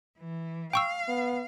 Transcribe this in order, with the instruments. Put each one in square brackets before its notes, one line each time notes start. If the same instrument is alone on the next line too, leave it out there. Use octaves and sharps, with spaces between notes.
[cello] E3
[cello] F5 [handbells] G5 C#6 E6
[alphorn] B3